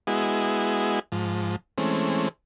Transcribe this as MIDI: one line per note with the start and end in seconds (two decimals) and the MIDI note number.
0.07 0.99 56
0.07 0.99 59
0.07 0.99 64
0.07 0.99 66
0.07 0.99 68
0.07 0.99 75
1.12 1.56 44
1.12 1.56 53
1.78 2.29 52
1.78 2.29 56
1.78 2.29 57
1.78 2.29 60
1.78 2.29 61